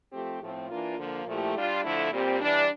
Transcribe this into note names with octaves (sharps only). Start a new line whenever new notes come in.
F3 A3 C4 G4
A2 F3 A3 C4
E3 A#3 D4 F4
D3 F3 A#3
A#2 F3 A3 E4 G4
G3 D4 F4
D3 F3 A3 E4
A#2 G3 C4 G4
E3 G3 D4